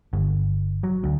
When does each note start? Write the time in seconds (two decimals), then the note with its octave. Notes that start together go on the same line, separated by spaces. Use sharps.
0.13 G1
0.83 F#3
1.04 D2